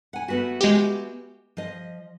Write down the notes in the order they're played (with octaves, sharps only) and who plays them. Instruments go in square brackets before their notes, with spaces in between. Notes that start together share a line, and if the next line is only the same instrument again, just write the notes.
[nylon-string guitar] F#5 G#5
A3 B3 F#4
[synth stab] G#3 G4
[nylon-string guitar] F3 D#5